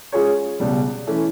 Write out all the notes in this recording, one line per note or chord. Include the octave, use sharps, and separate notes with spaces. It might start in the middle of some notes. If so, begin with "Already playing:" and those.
G#3 C#4 F4 G#4 C#5
C#2 B2 G3
E3 A3 C#4